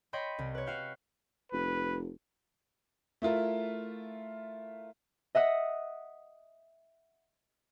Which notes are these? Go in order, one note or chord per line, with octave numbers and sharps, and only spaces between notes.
C#5 D#5 G5 B5 C6
C2
B4 C#5
F#4 F5 G5
F1 B4
A3 E4 F4 A#4
D#5 E5 F#5 D#6